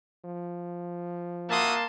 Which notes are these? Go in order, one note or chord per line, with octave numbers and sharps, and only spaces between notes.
F3
A#3 F#4 E5 A5 C6 D#6